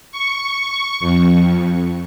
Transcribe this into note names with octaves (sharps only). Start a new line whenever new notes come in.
C#6
F2